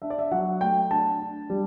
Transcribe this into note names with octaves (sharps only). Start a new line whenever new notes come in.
D4 E5
D5
E5
F#3 F#5
A3 G5
D4 A5
D4
G3